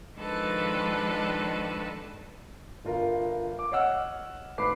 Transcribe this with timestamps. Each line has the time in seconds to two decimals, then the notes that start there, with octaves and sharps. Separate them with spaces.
0.17 D#3 F3 G#3 D4 A4 B4
2.85 G1 F4 A#4
3.59 D6
3.71 C#5 D#5 F#5 E6 F6
4.58 G#1 B4 B5 D6 C7